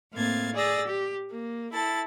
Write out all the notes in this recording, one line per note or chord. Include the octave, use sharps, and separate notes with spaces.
A2 A#3 C4 F5 G#6 A6
G#4 D5 E6 A6 A#6
G4
A#3
E4 A4 A6